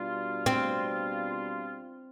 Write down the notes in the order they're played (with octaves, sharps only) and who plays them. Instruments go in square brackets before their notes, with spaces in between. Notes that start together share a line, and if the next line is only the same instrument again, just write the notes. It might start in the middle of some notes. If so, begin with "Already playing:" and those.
Already playing: [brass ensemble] B2 G3 D4 F4
[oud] C4